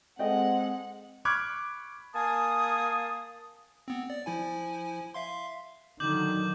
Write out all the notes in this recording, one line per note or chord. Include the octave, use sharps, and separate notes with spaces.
G#3 C4 A4 D#5 F#5 G5
B5 C#6 D6 F6 F#6 G#6
A#3 G#5 A5 D#6
B3 C4
D5
F3 E4 G#5
E5 F5 C6
D3 D#3 F#3 D6 G6 F#7